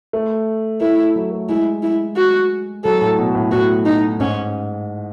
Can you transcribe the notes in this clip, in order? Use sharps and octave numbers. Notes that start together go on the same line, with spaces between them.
A3
A3 E4
F#3
A3
G#3 E4
E4
F#4
F#3 A4
A2
B2
A2
A2 F#4
D#4
G#2 C#4